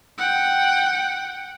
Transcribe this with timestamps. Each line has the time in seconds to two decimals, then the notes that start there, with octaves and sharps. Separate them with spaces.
0.18 F#5 G5